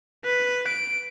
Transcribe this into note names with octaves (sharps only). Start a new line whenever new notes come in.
B4
D7